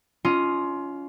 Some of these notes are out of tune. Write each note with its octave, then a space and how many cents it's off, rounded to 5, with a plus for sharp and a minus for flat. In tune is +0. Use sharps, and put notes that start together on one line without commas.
C#4 +30 F4 +0 D#5 +0